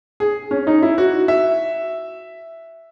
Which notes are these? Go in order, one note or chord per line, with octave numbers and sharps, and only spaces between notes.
G#4
C#4
D#4
E4
F#4
E5